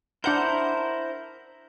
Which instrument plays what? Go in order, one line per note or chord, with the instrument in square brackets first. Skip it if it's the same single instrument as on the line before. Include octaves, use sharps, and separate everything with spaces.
[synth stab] D4 F#5 G6 [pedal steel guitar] E4 A#4 C5